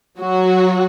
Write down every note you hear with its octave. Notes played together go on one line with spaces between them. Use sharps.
F#3 F#4